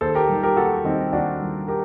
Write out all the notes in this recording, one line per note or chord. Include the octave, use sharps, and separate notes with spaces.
D#2 A4 C5
G4 A#4
D#3 G3
G4 A#4
D#2 F#4 A4
D#3 G3 C4 D#4
D#2 D4 F#4
D#3 G3
G4 A#4